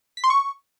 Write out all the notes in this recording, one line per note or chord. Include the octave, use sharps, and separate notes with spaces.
B6
C6
C#6